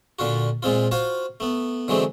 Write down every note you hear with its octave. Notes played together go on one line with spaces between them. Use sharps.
A#2 D3 F4 F#4
A#2 G#3 C4 F4
F4 F#4 C5 F5
A3 B3
D3 E3 F#3 G#3 A3 C4